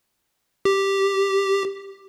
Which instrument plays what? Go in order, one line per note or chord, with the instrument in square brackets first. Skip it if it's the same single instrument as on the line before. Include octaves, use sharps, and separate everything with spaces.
[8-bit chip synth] G4